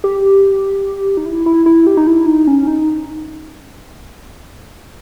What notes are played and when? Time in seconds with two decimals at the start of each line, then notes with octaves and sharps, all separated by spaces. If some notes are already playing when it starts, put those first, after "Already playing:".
0.04 G4
1.17 D#4
1.26 E4
1.46 E4
1.66 E4
1.87 G4
1.97 D#4
2.07 E4
2.26 D#4
2.47 C#4
2.67 D#4